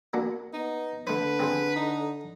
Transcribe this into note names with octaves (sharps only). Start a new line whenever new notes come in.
A#3 D4 F#4
B3 D#4
D3 A3 B4 C5
C4 G#4 C5
D#4